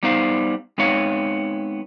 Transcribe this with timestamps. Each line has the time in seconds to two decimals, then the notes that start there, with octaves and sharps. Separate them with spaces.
0.03 G3 B3 D#4 C5 F5
0.78 G#3 B3 C4 D#4 C#5 F5